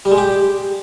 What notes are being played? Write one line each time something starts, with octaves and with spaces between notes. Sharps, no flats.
G3
G#3
G4